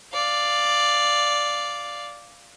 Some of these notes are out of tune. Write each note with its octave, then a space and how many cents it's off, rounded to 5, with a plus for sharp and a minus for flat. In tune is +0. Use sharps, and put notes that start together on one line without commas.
D5 +0 F5 +0